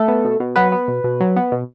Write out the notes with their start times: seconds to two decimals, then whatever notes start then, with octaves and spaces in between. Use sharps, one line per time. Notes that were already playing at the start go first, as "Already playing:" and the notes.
Already playing: A3 A4
0.08 B3
0.25 B2
0.40 B2
0.56 F#3 B3 B4
0.72 B3
0.88 B2
1.04 B2
1.20 F#3
1.36 B3
1.52 B2